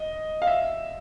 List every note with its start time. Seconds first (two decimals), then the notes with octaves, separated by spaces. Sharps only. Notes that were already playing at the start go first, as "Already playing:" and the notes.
Already playing: D#5
0.42 F5
0.47 E5